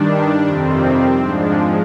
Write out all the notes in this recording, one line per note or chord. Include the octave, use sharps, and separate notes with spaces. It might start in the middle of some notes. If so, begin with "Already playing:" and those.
Already playing: G2 D#3 G3 D4
F2 C3 D#3 G3 C4
G#2 F3 G#3 D4